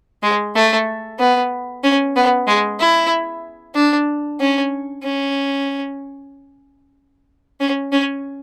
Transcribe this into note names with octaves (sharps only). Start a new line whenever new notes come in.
G#3
A3
B3
C#4
B3
G#3
E4
D4
C#4
C#4
C#4
C#4